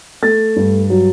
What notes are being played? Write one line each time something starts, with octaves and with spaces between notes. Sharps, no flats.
A3 A6
G2
F#3